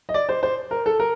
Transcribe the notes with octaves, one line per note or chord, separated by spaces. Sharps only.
D#5
D5
C5
C5
A#4
A4
A#4